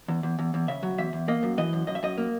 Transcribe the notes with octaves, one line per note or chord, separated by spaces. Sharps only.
E2
E2
E2
E2
C#3 E5
F#3
E2 E5
E2
A#3 D#5
F#2
E3 D#5
F#2
F#2 D#5
E5
F#2 D#5
A#3